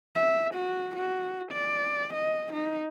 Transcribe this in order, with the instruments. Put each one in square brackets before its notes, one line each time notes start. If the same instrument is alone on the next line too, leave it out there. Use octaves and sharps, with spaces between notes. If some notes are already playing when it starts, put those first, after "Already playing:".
[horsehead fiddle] E5
F#4
F#4
D5
D#5
D#4